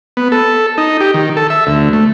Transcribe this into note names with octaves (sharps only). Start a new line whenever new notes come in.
B3
A4
D#4
G4
D#3
A4
E5
D2
A3